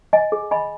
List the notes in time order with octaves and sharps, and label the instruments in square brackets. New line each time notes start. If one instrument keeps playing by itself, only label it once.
[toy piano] D#5 G#5
G#4
D#5 G#5 B5